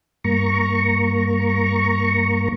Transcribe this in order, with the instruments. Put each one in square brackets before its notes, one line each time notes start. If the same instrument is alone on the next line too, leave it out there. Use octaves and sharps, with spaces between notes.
[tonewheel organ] G2 A#3 A#5 C#6